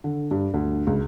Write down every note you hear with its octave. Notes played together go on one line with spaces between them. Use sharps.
D3
G2
D2
C#2